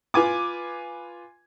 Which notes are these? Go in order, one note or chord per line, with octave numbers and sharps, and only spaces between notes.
F4 B4 G#5 D6